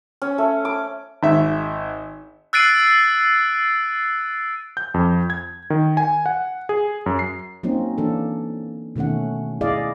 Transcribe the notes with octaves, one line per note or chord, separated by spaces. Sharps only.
C#4
A3
D6
G#1 E5
E6 F#6 A6 C7 D7 D#7
G6
F2
G#6
D#3
G#5
F#5
G#4
F#2
C7
F#3 A#3 C4 C#4 D#4
E3 A#3 D4 A4
B2 D#3 A3 C#4 F#5
E4 G#4 D5 D#5 F5